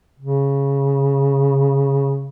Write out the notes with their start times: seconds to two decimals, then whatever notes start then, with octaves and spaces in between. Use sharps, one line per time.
0.20 C#3